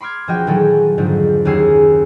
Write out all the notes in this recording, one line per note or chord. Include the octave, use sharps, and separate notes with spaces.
B5 C6 D6 F6 G#6
E1 F3 F#4 D#5 G5
A#2 D#3 E3 F#3 G#4 A4
F2 G#2 D3 D#3 F3
F#1 D#2 C#4 G#4 E6 C7